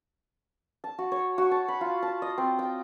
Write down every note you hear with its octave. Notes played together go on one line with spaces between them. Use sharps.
A5
F#4
C#5
F#4
A5
B5
F4
A5
D#5
C4
G5